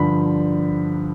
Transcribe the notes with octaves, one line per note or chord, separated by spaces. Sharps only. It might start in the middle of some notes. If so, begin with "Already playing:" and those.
Already playing: G2 D3 F3 B5